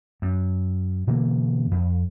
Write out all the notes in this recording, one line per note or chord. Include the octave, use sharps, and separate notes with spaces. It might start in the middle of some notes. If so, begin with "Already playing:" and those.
F#2
B2 D3 E3 A#3
F2